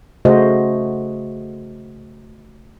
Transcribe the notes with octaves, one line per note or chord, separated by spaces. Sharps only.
C#3 A3 F#4 C5 D#5